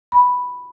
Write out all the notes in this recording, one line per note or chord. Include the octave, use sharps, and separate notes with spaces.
B5